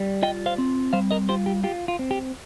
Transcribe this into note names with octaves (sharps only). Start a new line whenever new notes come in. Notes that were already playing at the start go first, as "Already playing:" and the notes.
Already playing: G3
F4 D#5 G5
C5 F5
C4
G3 C5 F5
A#4 D#5
F4 G4 C5
G4
F4 G4
F4
C4
G4